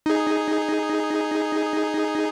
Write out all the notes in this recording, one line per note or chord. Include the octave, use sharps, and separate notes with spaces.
D#4 G#4